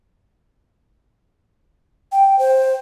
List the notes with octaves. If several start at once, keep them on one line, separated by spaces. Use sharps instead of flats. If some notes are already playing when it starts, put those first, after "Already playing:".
G5
C5